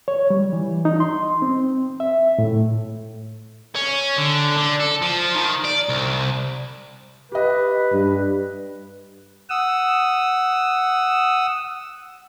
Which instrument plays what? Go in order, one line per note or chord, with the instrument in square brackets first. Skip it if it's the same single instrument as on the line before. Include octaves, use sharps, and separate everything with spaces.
[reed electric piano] C#5
G3
E3
D#4
C6
C4
E5
A2
[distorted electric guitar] C#4
D3
D3
A4
F3
D#3
D5
C2
[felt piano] G4 D#5 [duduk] B4
[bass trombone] G2
[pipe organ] F#5 D#6 E6